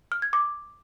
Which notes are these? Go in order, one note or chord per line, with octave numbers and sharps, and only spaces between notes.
F6
G#6
D6